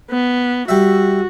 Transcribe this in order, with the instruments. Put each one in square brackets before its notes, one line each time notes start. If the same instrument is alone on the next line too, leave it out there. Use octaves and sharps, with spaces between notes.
[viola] B3
[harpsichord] G3 E5 [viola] F#4